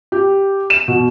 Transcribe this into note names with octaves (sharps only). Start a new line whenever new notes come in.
G4
E7
B2